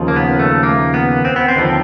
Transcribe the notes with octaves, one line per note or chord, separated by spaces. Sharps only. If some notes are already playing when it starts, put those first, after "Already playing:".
Already playing: D#2 C#3 F3
A#3
B3
A3
A#3
B3
C4
B3
C4
D#2 D3 F3